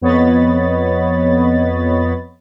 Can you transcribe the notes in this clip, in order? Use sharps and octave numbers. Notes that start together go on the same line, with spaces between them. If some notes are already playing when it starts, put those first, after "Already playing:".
F2 B3 C#5 D#5 B5 A6